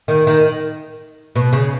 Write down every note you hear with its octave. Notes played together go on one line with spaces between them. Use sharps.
D#3
D#3
B2
C#3